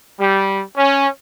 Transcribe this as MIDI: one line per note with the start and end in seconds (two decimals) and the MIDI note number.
0.20 0.62 55
0.76 1.07 61